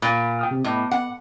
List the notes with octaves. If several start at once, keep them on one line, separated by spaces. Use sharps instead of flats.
A#2 B5
G5 D#6 F6
C3
A2 B3 D#5 D6
F#5